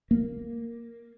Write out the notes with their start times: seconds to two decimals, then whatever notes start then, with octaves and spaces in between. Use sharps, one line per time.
0.11 A#3